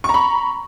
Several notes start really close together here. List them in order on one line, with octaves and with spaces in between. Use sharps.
C#6 A#5 B5